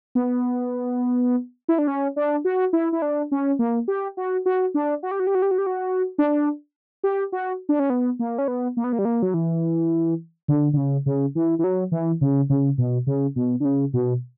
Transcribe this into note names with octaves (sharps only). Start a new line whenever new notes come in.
B3
E4
D4
C#4
D4
F#4
E4
E4
D4
C#4
A#3
G4
F#4
F#4
D4
F#4
G4
F#4
G4
F#4
G4
F#4
G4
F#4
D4
G4
F#4
D4
C#4
B3
A#3
C#4
B3
A#3
B3
A#3
G3
A#3
F#3
E3
D3
D3
C#3
C#3
E3
E3
F#3
E3
C#3
C#3
B2
C#3
B2
D3
C#3
B2